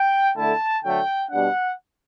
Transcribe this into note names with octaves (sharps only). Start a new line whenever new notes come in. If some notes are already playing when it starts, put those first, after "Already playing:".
Already playing: G5
D3 A3 E4 A5
D3 F#3 A3 G5
B2 G3 D4 F#5